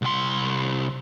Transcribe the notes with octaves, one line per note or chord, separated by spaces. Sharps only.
C2 C6